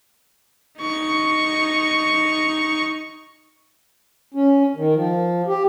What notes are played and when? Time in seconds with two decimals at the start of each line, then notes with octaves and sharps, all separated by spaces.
0.79 D#4 C#6
4.34 C#4
4.76 D#3
4.95 F3
5.48 G4